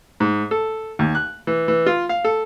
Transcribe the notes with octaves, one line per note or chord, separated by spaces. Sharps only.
G#2
A4
D#2
F#6
E3
E3
F4
F5
A4